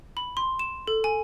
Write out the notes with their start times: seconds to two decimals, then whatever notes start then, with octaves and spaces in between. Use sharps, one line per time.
0.17 B5
0.37 C6
0.59 E7
0.88 A4
1.04 G#5